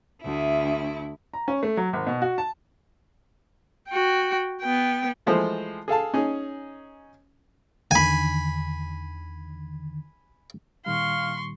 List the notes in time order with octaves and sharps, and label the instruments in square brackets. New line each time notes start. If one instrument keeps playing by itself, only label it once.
[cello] D2 E4
[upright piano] A#5
C#4
A3
F#3
G#1
B2
F#4
A5
[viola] F#4 G5
B3 G5
[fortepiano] E3 F3 G#3 A3 C5
G#4 A4 F5 A5
C#4 D#4 G#4
[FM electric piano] E2 D3 D#3 [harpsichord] G#5 B5
[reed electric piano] A#2 D#3 G3 [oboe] F5 [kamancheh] C6 C#6